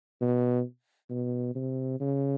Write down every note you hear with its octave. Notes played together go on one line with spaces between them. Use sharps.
B2
B2
C3
C#3